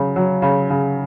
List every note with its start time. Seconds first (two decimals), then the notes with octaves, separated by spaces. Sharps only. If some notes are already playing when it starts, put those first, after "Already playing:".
Already playing: C#3 F#3
0.16 F#3
0.42 C#3
0.70 C#3